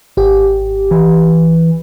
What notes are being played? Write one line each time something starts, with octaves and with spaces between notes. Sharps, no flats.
G#1 G4
E3